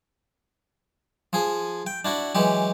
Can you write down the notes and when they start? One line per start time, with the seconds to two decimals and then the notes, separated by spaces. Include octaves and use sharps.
1.33 F3 G#4
1.87 G5
2.05 D4 E4 F#4
2.35 E3 F#3 G#3 G4